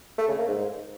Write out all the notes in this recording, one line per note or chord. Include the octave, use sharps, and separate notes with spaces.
A3
C#3
A#3
G#2